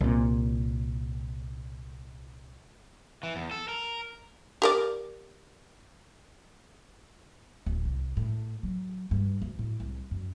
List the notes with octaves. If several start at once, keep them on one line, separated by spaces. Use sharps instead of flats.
C2 A#2
E3
E2
A4
A#4
G4 A#4 D5
D1
C2
A2
F#3
G2
D2
A2
C2
F#2